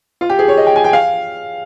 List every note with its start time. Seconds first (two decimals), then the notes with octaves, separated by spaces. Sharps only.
0.21 F4
0.30 G4
0.39 G#4
0.48 C#5
0.57 D#5
0.67 G5
0.76 G#5
0.84 G5
0.93 F5